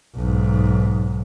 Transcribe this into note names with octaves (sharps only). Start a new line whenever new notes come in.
B1 G#2